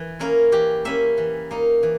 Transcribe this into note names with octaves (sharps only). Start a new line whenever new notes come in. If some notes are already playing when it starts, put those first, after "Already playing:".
Already playing: E3
A#3 C#4 E4 A#4
E3 G4
A#3 C#4 E4 E5
E3
A#3 D#4
E3